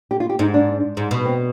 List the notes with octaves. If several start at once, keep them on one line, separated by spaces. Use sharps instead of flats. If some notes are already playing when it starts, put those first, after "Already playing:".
G4
F4
G4
G#2 D#4
D4
G#2
B2
C4